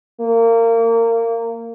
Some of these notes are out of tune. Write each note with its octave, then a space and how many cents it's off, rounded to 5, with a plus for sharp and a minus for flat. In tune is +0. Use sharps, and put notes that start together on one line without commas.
A#3 -25